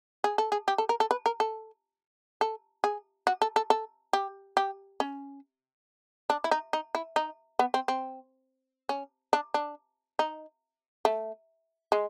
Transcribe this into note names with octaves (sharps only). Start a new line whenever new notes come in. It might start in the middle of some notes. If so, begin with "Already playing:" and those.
G#4
A4
G#4
G4
A4
A#4
A4
B4
A#4
A4
A4
G#4
F#4
A4
A4
A4
G4
G4
C#4
D4
E4
D#4
D#4
E4
D#4
B3
C4
C4
C#4
D4
D4
D#4
A3
G#3